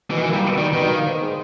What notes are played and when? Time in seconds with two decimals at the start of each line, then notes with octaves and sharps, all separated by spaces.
0.11 B2 E3
0.17 D#3
0.23 E3
0.26 A#3
0.34 G3
0.42 B2
0.58 D#3 G3
0.73 B2 D#3
0.89 A#3
1.05 G#2
1.21 G#3